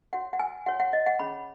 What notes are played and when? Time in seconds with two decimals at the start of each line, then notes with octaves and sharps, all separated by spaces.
0.13 F#4 C#5 F#5
0.33 F#5
0.39 G#5
0.66 F#4 C#5 F#5
0.80 F#5
0.93 D#5
1.06 F#5
1.19 C#4 G#4 C#5 B5